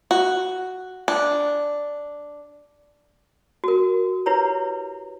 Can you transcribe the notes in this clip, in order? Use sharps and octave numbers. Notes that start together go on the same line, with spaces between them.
F#4
D4
F#4 A#4
E4 G4 B4 C#5 A#5